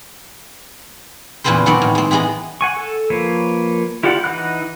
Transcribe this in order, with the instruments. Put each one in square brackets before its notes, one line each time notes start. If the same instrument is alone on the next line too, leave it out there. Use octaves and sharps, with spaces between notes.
[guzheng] E2 A#2 C#3 C4 B4 C5
D#3 F#3 B3 C4 F#4 D5
A2
G#3 C4
E3 G#3 B3 G#4 D#5
[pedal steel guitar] F#5 G#5 C#6
A4
F3 A#3 B4 C#5
E4 F4 G4 D5 F#5
E3 D#4 F#5 B5 F#6